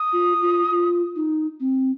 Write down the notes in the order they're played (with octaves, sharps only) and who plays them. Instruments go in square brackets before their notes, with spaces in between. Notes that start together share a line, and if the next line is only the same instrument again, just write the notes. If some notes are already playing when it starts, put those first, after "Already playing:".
Already playing: [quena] D#6
[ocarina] F4
F4
F4
D#4
C4